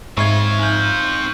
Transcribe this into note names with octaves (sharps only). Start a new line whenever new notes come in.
G#2 G#3 C4 E5 F5 C#6 G#6
D#4 F6 G6 F#7